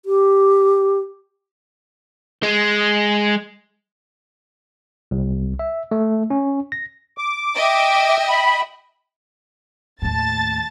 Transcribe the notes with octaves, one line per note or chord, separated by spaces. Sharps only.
G4
G#3
C2
E5
A3
C#4
A#6
D6
D#5 E5 G5
B5
D#2 A2 A5 A6